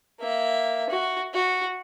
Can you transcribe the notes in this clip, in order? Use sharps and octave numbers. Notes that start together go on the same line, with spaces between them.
A#3 E5
F#4
F#4